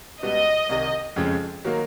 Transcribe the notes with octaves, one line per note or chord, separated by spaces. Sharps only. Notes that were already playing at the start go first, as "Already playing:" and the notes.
C#2 B2 G3 B3 D#5
C2 C3 D#3
F2 C#3 F3 G#3
D#3 F#3 A#3